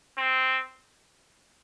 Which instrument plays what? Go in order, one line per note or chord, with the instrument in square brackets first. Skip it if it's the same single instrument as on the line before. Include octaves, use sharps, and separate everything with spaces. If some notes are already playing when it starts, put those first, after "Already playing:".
[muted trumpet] C4